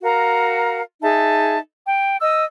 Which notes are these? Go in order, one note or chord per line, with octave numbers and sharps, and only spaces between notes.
F#4 A#4 F5 A#5
D#4 G#4 E5 A5
G5
D#5 E6